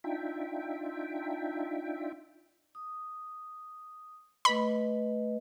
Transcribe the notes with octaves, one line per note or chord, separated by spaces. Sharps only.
D4 D#4 F4 E5 G5
D#6
A3 B4 D#5 B5